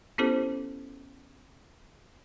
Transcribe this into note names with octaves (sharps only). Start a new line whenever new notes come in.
B3 C#4 E4 G4 A4 C5